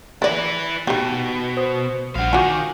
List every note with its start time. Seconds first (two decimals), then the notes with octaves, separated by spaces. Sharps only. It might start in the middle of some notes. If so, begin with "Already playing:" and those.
0.22 E3 E4 B4 D5 A6 A#6
0.87 B2 D#4 G4
1.57 C5 D#6
2.15 A#1 G2 F5 F#5
2.33 D#3 F4 F#4 G#5 D6 G6